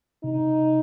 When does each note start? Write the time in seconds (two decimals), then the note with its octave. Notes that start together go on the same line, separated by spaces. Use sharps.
0.24 C3 D#4